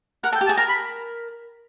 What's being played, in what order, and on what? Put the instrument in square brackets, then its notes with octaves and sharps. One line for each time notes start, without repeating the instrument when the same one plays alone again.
[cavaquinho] A#4 [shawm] F#5
[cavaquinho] A4 [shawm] G5
[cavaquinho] G4
[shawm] A5
[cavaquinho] G#4
[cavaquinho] A#4 [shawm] A#5
[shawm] B5